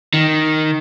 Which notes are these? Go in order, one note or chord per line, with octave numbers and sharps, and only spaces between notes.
D#3